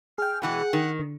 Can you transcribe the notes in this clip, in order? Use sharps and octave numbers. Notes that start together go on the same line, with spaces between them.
G#4 G5 F6
B2 E3 G#3 F#5
D#3
D3